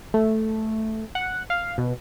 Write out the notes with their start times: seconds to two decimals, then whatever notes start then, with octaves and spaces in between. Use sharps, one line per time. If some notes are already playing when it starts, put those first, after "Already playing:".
0.14 A3
1.15 F#5
1.50 F5
1.78 B2